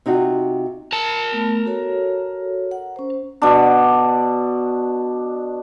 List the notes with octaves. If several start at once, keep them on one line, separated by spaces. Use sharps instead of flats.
C3 D#4 F4 F#4
A#4 A5
A3 B3
F#4 A4 C#5
F#5
C#4 C5
B2 D4